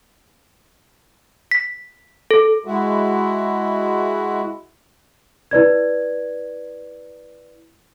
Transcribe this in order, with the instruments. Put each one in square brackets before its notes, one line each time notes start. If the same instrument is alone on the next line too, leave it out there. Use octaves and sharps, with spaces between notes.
[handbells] B6
A4
[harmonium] G#3 E4 F#4
[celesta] E4 B4 D5 G#6